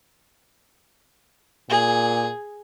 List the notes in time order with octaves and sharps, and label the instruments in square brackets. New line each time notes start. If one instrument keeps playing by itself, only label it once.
[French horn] A#2 [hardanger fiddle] G#4